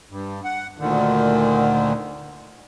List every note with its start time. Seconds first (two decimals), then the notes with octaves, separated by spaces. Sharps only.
0.10 G2
0.44 F#5
0.78 D2 A#2 D3 D#3